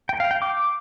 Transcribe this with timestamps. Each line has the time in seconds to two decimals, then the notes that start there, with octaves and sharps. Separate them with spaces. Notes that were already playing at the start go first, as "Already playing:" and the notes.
0.09 G5
0.20 F5
0.31 G5
0.42 D6